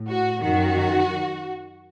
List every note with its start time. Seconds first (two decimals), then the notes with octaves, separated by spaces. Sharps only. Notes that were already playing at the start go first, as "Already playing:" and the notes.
Already playing: A2
0.09 F#4
0.42 F#2 D#3 F#4